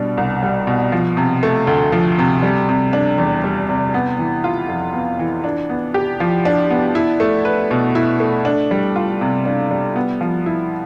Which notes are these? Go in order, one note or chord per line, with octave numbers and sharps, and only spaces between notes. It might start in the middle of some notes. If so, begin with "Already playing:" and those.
Already playing: B2 G3 D4
C2
G3
B2
F3
C3
A3
D2
F3
C3
G3
C3
D4
E2
G3
C3
B3
E3
F4
F2
B3
E3
D4
B3
G4
F3
D4
B3
E4
A3
B4
B2
E4
A3
D4
G3
F4
C3
D4
G3
B3
F3
E4